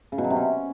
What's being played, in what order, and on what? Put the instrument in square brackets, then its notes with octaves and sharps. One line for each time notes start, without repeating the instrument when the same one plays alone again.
[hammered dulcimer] C#3
B2
F#3
C3
C#4